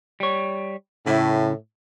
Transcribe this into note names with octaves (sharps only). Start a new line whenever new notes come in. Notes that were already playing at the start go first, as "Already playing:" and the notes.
G3 C#5
A2 C#3 E4